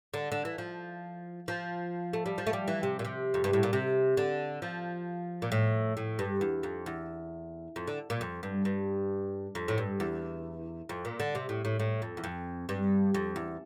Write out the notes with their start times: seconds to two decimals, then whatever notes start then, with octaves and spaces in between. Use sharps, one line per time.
0.14 D3
0.32 D3
0.45 E3
0.58 F3
1.48 F3
2.13 A3
2.26 G3
2.38 F3
2.47 A3
2.53 G3
2.68 E3
2.83 C3
2.99 A#2
3.05 C3
3.34 F2
3.44 G2
3.53 A2
3.63 A#2
3.73 C3
4.17 D3
4.62 F3
5.42 A#2
5.52 A2
5.97 A2
6.19 G2
6.41 E2
6.63 F2
6.86 E2
7.76 F2
7.87 D3
8.10 A#2
8.21 F2
8.43 G2
8.65 G2
9.55 F2
9.68 A2
9.78 G2
10.00 E2
10.89 F2
11.05 A#2
11.20 D3
11.35 C3
11.49 A2
11.65 A2
11.80 A2
12.02 F2
12.17 E2
12.24 F2
12.69 G2
13.14 F2
13.36 E2